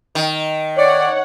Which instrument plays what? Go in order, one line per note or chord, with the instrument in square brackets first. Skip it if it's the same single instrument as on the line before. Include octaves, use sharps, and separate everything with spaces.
[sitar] D#3
[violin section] C#5 F#5 [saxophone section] D5